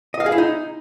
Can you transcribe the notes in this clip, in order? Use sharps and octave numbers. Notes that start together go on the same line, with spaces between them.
D#5
F5
G#4
E4
D#4